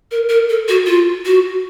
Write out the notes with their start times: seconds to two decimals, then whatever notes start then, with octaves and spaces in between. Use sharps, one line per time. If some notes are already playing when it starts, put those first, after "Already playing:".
0.11 A#4
0.29 A#4
0.49 A4
0.68 F#4
0.86 F4
1.25 F#4